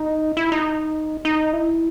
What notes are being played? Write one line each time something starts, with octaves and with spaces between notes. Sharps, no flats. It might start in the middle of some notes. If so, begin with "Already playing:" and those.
Already playing: D#4
E4
D#4
D#4
E4